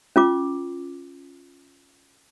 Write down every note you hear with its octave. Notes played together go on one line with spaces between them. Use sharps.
C#4 F4 D6